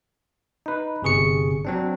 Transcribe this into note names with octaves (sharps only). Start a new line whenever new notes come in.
D#4 B4
G1 C3 G#4 C#6 C#7
F#3 C4 D4